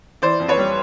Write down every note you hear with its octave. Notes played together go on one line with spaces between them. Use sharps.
E3 C5 D5
F2
B4 C#5
G3